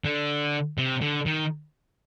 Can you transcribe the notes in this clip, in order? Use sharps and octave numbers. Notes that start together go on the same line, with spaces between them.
D3
C3
D3
D#3